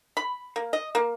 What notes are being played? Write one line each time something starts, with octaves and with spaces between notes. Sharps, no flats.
B5
A#3
D#5
A#3